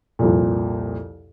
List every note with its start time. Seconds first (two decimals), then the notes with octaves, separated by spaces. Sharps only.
0.19 C2 F2 A#2